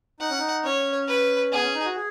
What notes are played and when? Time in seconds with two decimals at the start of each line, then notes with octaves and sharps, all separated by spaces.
0.20 D#4 F#5
0.30 C#4
0.39 D#4
0.64 C#4 C#5
1.08 B4
1.52 B3 G#4
1.63 C#4
1.74 D#4
1.85 F#4
1.95 G#4